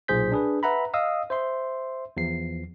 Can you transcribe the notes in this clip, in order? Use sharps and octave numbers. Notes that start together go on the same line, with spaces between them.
B1 A#2 G#4 C5 G6 B6
D4 G#4 B4
B4 E5 F#5 A#5 B5
D#5 F5 D#6 E6
C5 E5 C6
E2 F3 C7